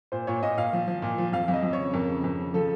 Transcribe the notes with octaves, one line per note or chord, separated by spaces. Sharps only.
A#2 C5
A#2 C#5
A#2 D#5
A#2 F5
F3
F3
A#2
F3
F2 F5
F2
D#5
F2
C#5
C#3
F2 A#4
C#3
F2
C#3
F3 A4